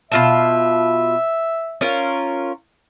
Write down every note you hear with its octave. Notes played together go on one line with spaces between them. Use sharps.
B2 F4 E5 A5
C#4 F4 A#4